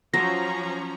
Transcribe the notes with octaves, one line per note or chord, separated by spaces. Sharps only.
F3 F#3 C#4 C5 A#5 A#6